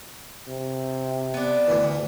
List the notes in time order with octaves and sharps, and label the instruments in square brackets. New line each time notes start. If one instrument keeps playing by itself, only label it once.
[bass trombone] C3
[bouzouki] B3 D4
[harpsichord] D2 E3